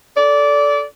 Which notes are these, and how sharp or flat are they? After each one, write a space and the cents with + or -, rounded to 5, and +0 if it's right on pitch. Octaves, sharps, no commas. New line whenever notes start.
A4 +0 D5 -20